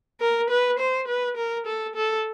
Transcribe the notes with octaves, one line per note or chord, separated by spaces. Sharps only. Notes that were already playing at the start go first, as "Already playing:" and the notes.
A#4
B4
C5
B4
A#4
A4
A4